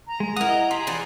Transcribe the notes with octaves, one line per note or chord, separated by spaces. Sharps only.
A#5
G#3
E4 A#4 F#5 D#6
D#5
G4 G#4 C6
E3 F3 D5